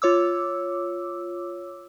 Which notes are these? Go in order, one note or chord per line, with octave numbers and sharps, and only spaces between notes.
F4 C#5 D6 E6